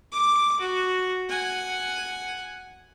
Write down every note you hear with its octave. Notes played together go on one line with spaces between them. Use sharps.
D6
F#4
F#5 G#5